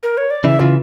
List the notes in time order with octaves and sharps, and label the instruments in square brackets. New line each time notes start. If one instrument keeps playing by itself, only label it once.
[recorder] A#4
C#5
D5
[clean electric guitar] C#3 E3 [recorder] E5
[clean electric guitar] C#3 E3 [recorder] F4